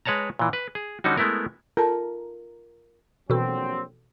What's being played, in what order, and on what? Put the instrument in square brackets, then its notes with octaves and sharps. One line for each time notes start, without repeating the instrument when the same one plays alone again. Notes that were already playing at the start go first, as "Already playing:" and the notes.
[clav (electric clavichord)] G#3 B4 C#5 A5 A#5
A#2 E3
B4
G#4
D3 G3 C#4 D#4 F#4
G#3 A3 B3 E4 A#4
[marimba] F4 A4 A5 [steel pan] A#4
[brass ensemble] A#1 F#3 C4 [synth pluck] B2 E3 A4